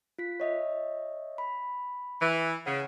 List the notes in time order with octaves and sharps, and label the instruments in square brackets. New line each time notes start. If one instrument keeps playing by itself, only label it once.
[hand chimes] F4 B6
C#5 D#5 E5
B5
[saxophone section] E3
[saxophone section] C#3 [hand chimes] F#5